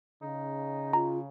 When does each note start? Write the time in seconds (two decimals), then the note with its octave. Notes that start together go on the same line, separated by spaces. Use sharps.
0.22 C#3 D#4
0.93 F4 A#5